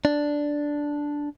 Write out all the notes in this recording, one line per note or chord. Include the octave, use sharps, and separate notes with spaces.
D4